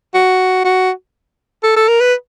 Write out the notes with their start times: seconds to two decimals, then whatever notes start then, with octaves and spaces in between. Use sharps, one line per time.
0.14 F#4
0.64 F#4
1.63 A4
1.76 A4
1.88 A#4
2.01 B4